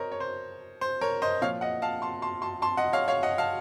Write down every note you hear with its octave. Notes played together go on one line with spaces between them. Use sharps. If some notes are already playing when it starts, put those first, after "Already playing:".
Already playing: A#4 C5 C#5 D#5
C#5
C5
C5
A#4 C#5
C5 D#5
A#2 F3 C#5 F5
D#5 F#5
F5 A5
A5 C6
A5 C6
A5 C6
A5 C6
D#5 F#5
C#5 F5
C#5 F5
D#5 F#5
F5 A5